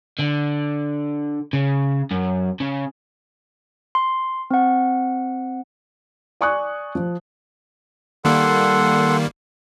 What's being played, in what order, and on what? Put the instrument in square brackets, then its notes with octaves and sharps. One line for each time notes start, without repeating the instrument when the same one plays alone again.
[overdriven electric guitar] D3
C#3
F#2
C#3
[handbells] C6
C4 F#5
[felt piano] D5 G#5 C#6 D#6 F#6
F3
[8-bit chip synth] D#3 G3 A#3 [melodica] A4 F#5 C6